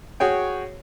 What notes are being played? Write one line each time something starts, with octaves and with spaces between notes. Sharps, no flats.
F#4 G#4 C#5 G5